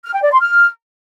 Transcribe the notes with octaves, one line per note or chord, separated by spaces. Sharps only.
F6
G5
D5
C6
F6